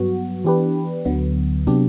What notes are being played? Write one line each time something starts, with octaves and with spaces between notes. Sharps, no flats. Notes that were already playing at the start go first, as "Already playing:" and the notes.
Already playing: G2 F#3 B3 F#4
E3 B3 D4 G4 B4
D2 D3 F#3 B3
C3 F#3 B3 D4 G4